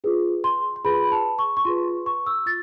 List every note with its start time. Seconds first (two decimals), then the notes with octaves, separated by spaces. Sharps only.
0.04 F4 G#4 B4
0.44 C6
0.76 C6
0.85 F4 G#4 B4 B5
1.12 A5
1.39 C#6
1.57 C#6
1.65 F4 G#4 B4 C6
2.06 C#6
2.26 E6
2.46 F4 A6